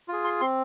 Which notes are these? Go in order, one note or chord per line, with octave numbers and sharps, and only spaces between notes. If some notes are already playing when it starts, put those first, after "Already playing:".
F4 G#4
C6
C4 C6